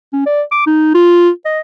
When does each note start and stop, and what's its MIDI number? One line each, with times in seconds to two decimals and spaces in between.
0.13 0.24 61
0.26 0.42 74
0.52 0.65 86
0.66 0.94 63
0.94 1.30 65
1.45 1.60 75